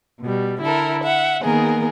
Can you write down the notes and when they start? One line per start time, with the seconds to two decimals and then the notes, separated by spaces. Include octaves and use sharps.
0.22 B2 G3
0.62 D3 E4 A4 A#4
1.03 E5 F#5
1.43 D#3 A#3 B3 G#4 A#4